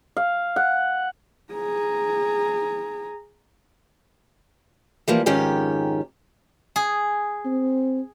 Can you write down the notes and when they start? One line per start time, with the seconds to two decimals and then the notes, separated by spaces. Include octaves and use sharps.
0.17 F5
0.56 F#5
1.53 G#4 A#5
5.08 E3 F3 G3 A#3
5.26 F2 G#2 D#3 C#4 G4
6.76 G#4
7.45 C4